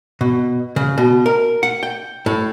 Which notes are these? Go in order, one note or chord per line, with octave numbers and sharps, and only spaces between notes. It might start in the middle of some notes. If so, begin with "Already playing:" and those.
B2
C#3
B2
A#4
F#5
G5
A2